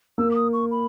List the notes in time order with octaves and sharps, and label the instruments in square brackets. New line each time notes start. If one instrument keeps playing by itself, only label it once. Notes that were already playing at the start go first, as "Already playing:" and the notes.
[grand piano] A#3 [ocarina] E6
[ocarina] D6
D#6
C#6
B5